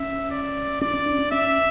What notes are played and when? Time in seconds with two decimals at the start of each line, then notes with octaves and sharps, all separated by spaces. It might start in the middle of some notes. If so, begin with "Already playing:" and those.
Already playing: C#4 E5
0.31 D5
0.81 C#4 D5
0.94 C#4
1.06 D4
1.19 C#4
1.32 C#4 E5